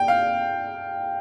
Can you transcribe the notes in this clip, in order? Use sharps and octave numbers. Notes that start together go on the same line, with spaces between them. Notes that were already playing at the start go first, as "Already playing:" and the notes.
Already playing: G5
F5